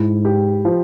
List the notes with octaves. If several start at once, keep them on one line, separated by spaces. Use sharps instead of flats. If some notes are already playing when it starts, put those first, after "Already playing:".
Already playing: G#2 E4
G4
F3